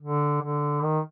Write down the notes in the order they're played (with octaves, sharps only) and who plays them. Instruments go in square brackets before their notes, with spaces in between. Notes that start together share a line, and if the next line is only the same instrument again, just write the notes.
[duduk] D3
D3
D#3